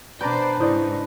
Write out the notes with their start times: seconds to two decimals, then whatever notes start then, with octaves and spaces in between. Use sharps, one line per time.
0.21 B2 D4 B4 C5 D5 A#5 G6
0.60 G#2 C#3 D#4 E4 C5 D5 D#6 G6